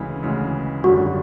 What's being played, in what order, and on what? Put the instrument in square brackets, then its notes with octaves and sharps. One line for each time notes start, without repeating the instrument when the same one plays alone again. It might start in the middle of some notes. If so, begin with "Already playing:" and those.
Already playing: [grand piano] D2 C#3 E3 G#3
D2 C#3 E3 G#3
[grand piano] G#1 F#2 D3 G3 [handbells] F#4